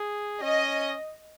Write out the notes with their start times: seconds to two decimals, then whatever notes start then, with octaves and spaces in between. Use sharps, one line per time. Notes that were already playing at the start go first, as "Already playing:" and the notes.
Already playing: G#4
0.42 C#4 D#5